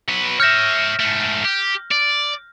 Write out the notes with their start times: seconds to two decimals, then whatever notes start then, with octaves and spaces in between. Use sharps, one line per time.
0.08 F#3 B4
0.40 C#5 E5 F6 G6 A#6
1.00 G#2 A3
1.44 G4
1.91 D5